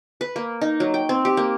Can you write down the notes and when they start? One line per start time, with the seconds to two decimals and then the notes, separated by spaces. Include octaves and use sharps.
0.21 B4
0.36 A#3
0.61 D#4
0.80 F#3
0.94 G5
1.09 C4
1.25 G4
1.37 A#3